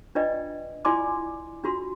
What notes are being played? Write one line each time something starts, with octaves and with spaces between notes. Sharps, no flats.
D4 F4 B4 D5 D#5 G5
E4 F4 D5 G#5 C6 D6
D4 F4 F#4 C6